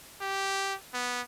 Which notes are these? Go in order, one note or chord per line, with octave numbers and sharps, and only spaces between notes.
G4
B3